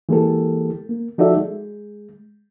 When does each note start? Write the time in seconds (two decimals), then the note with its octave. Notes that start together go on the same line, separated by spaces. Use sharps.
0.09 E3 G#3 A#3 G4 A4
0.89 A#3
1.18 F3 D#4 F#4 A4 D5 E5
1.37 G#3